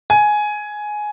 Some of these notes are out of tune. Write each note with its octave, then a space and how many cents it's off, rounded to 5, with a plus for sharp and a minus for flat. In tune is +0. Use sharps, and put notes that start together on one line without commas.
G#5 +10